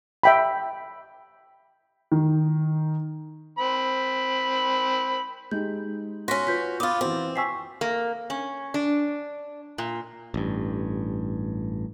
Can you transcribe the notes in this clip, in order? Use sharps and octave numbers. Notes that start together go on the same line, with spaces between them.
E5 G5 B5
D#3
C4 B5
G#3 D#4 G4 G6
C#4 F#4 C6 A#6 B6
F4 B4 G6 B6
B3 F4 D6 D#6 A6
E3 C4 F#4
G5 G#5 C#6 E6 B6 C7
A#3
C#4
D4
A#2
A1 G2